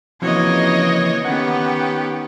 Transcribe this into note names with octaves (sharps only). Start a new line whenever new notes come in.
C#3 E3 F3 A#3 C4 F#4 C#5 D#5
D#3 B3 C#4 G4 F#5